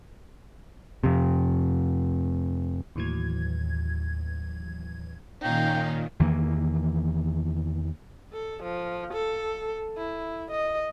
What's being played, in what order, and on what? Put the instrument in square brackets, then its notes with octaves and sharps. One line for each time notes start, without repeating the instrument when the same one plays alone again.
[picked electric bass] F2 C3
[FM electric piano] D#2 A2 E3 F#3 G#6
[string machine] A#2 D#3 [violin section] C#4 D#4 F5 [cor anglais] G5
[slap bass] E2 D#3 E3 A#3
[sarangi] A4
F3
A4
E4
D#5